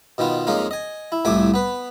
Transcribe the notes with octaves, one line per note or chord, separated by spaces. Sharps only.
B2 D#3 B3 F4
F2 G#3 A#3 C#4 D#4 F5
D#5 G#5
E4
C2 F2 A2 A3 G#5 D6
B3 B4